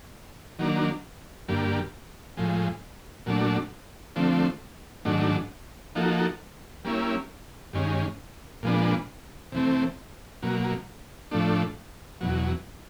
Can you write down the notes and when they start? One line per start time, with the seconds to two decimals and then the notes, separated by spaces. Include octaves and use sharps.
0.59 D#3 F#3 A#3 D4
1.48 G2 D3 G3 A#3
2.37 A2 F3 G#3
3.26 A#2 F#3 A3 D4
4.16 D3 F3 A3 C4
5.05 G#2 D#3 F#3 A3 D4
5.95 F3 A#3 D#4 F#4 A4
6.85 G3 A#3 C#4 E4
7.73 G2 D#3 G#3 C#4
8.63 A#2 F3 G#3 B3 D4
9.52 C3 E3 A3 C4
10.43 B2 F#3 A#3
11.31 A2 F3 A3 D4
12.21 E2 B2 F#3